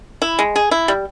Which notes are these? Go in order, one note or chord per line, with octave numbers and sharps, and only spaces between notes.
E4
G#3
G#4
E4
G3